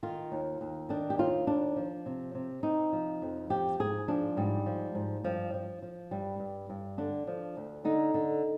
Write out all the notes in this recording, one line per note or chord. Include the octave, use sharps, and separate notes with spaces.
D#3 F4
D#2
D#2
D#3 D4
G4
D#2 F4
D#2 D4
F3
C3
C3
C3 D#4
F3
F2
F3 G4
G#2 G#4
F3 D4
G#2 G3
F3
G#2
G2 F3
F3
F3
G2 G3
G2
G2
D3 D4
F3
D2
D3 D#4
D3